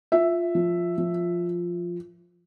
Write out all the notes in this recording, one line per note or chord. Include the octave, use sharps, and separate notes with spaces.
F4 E5
F3
F3